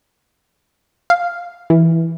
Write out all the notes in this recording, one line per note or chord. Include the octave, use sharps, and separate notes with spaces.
F5
E3